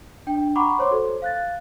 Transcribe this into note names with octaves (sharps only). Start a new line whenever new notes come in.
D4 G5
F#5 A#5 B5 C#6 D6
C5 C#5 C6 D6
F#4 A4 C5
F5 F#6 A6